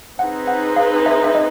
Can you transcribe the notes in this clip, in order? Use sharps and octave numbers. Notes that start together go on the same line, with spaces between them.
C4 D#4 G#4 B4 F#5
F#5
F5
E5
E5
D#5